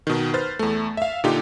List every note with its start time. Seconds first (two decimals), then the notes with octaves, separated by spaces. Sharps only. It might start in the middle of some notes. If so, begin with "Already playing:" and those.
0.07 B2 D#3
0.34 B4 C5 F6 A6
0.59 E2 A3
0.97 E5 F5
1.24 A#2 D3 D#4 F4 G4